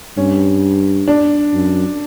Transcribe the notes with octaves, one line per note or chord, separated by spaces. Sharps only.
G2 C#4
D4
F#2